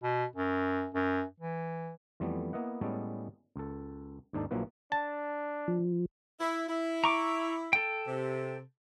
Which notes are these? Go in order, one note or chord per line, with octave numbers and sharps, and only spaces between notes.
B2
F#2
F#2
E3
F2 E3 G3 A3 B3
A#3 B3 E4 D#5 F#5
A2 G3 G#3 B3 C#4 A4
C#2 A4
D#2 G#2 D4 D#4 A4
A#1 F3 F#3 A#3 E4 B4
D4 A5
F3
E4
E4
A#5 C#6 D6
A4 G5
C3